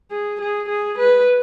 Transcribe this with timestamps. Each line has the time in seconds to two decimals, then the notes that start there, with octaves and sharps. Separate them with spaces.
0.12 G#4
0.41 G#4
0.68 G#4
0.98 B4